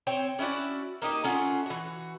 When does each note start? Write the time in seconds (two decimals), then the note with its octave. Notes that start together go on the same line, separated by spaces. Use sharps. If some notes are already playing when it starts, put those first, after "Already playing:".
0.07 C4 C5 C#5 G5
0.39 C#4 E4 F#4 D5
1.02 A#3 D#4 G4 D#5
1.24 A3 C#4 F4 F#5
1.66 E3 F#4